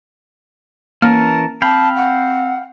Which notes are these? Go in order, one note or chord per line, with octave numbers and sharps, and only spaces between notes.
E3 A#3 C#4 A#4 A5 F6
C4 F5 G5 A5 B5
F#5